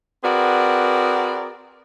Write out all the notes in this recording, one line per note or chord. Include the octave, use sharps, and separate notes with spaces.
C4 F#4 G#4 A#4 B4 D5